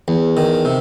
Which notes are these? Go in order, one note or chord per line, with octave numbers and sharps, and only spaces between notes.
E2
D#3
C3